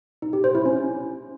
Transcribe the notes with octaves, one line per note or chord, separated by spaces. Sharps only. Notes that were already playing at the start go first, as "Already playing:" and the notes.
D#4
G4
C5
E4
C#4